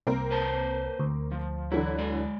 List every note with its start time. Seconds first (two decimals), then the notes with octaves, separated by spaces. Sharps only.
0.07 C2 A#3 C4 A#4
0.31 B4 C5 A5
0.99 D2
1.32 F3
1.72 D3 E3 F#3 E4
1.98 G#3 D5